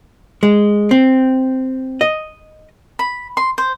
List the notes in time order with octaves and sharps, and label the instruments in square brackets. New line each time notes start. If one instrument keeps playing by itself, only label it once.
[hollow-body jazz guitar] G#3
C4
D#5
[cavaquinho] B5
C6
C5